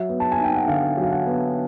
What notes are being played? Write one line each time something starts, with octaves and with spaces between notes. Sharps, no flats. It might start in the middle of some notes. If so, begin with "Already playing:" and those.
Already playing: F#3 E5
B3
A5
G#5
D#4
G5
F#5
D3 F5
F#3
F5
F#5
B3